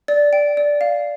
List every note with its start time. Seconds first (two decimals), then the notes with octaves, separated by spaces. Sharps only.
0.08 D5
0.33 G5
0.57 D5
0.81 F5